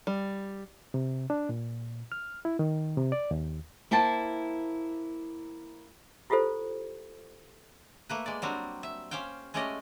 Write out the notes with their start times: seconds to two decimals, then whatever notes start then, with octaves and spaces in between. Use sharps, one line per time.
0.07 G3
0.94 C3
1.30 D4
1.49 A#2
2.12 F6
2.45 E4
2.59 D#3
2.97 C3
3.12 D5
3.31 D#2
3.91 A#3 E4 C5 G5 A5
6.30 E4 F4 G4 A4 C5
8.09 A3 A#3 B4
8.26 G#3 D5
8.42 F#3 G3 C4 D4
8.83 E5
9.11 C#4 G4 C5 F5 G5
9.54 G#3 A3 C#4 G4 D5 D#5